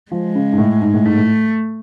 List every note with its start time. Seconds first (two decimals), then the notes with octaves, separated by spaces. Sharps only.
0.12 F3 G#3
0.35 C#3
0.53 G#2
0.58 A2
0.82 G#2
0.94 A2
1.05 G#2 A3
1.17 A2